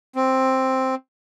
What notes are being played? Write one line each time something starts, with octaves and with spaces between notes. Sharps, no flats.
C4